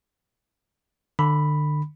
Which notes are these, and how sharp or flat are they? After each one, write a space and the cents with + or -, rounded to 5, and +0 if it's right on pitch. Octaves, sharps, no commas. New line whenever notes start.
D3 +35 B5 +0